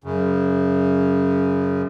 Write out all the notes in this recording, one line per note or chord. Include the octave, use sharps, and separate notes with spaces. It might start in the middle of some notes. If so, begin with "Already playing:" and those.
F#2 C#3